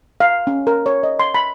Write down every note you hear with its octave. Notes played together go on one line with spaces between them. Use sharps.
F5
C#4
A#4
C#5
D#5
C6
B5